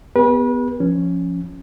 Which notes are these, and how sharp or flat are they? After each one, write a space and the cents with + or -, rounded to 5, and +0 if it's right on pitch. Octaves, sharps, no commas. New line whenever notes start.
B3 +0 G4 +40 B4 -35
F3 +0 C#4 +0